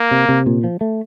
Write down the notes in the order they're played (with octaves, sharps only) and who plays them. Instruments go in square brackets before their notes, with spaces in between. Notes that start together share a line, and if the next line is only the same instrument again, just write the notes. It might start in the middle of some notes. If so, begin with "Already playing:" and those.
Already playing: [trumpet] A#3
[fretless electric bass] C3
C3
A#2
F3
A3